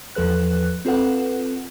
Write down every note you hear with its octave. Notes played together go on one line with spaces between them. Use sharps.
E2 F3 A4 B4 F#6
C4 F4 A4 B4 F#5